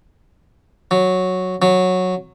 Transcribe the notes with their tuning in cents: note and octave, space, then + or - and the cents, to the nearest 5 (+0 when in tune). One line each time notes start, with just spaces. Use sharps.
F#3 -5
F#3 -10